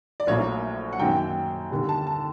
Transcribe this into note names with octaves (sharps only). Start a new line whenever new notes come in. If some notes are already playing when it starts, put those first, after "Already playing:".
D5
A#1 A2 F#3 A#3 C#5
F#5
F#2 D#3 F#3 A#3 G5
D#2 D3 G3
A5
A5